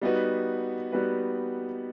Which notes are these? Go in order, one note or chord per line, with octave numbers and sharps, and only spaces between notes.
G3 B3 D#4 F#4 B4
G3 B3 D#4 F#4 B4